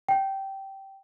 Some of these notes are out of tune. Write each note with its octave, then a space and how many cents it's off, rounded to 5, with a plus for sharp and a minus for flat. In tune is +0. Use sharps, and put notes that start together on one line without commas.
G5 -15